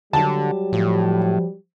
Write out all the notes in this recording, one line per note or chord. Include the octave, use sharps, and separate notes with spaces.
D3 F#3 G3 G4 A5
A2 F3